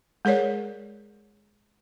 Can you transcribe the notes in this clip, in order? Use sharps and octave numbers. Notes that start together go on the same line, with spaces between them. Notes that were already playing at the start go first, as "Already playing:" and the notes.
G#3 G#4 A#4 C#5 D5